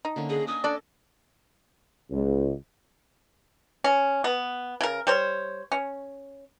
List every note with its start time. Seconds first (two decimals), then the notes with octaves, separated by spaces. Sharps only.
0.05 D#4
0.16 D3 A#3 C#4
0.30 G#4 D#5
0.47 D4 D#5 G#5 D#6
0.64 C#4 D4 A4 D5
2.11 C#2
3.84 C#4
4.24 B3
4.81 C#3 A#4
5.07 G3 C5 C#5
5.72 C#4